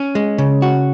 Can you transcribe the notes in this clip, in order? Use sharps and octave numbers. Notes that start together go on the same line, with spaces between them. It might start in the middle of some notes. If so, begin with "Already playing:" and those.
Already playing: C#4
G#3
C#3
F#4